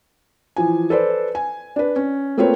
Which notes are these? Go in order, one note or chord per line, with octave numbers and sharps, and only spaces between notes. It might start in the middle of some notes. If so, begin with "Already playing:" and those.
E3 F3 G#5
A4 B4 C5 D5
G#5
D4 B4
C#4
A3 A#3 C4 F4 B4 C#5